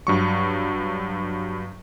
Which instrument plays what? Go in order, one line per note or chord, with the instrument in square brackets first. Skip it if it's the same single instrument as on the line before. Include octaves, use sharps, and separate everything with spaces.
[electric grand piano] G2 F#3 C#6